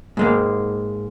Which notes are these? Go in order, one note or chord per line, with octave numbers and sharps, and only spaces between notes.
G#2 G#3 A#3